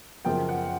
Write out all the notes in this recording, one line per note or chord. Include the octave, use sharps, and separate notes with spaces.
F#2 C#3 F3 A#3 G5
F#5